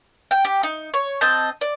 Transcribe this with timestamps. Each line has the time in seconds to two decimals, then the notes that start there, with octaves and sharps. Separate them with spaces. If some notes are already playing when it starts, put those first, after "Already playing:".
0.31 G5
0.45 G4
0.63 D#4
0.94 C#5
1.21 C4 D#5 A5 G6
1.61 D5